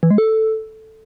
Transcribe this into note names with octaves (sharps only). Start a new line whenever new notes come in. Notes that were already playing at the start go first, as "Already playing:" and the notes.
E3
G#3
A4